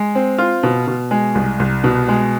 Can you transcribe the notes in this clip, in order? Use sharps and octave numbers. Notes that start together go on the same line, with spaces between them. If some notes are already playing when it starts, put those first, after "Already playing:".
Already playing: G#3
C4
F4
B2
B2
G#3
C2
C2
B2
G#3